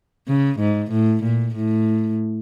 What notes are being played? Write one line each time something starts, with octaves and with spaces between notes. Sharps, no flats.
C#3
G#2
A2
A#2
A2